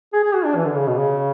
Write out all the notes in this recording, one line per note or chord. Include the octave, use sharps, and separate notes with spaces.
G#4
G#4
F#4
D4
E3
D3
C#3
B2
C#3